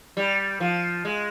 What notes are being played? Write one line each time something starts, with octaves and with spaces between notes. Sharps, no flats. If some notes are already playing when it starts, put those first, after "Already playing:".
G3
F3
G#3